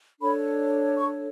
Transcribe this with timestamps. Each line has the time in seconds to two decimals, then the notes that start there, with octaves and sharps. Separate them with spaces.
0.20 D4 A4 C#5 B5
0.97 C#6